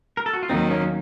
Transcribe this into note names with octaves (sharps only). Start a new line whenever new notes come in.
A#4
A4
F#4
F4
D#2 D#3 F#3 C4 D#4
A#3 C#4